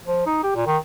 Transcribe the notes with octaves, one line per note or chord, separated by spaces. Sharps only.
F3
D#4
G4
A#2
D#3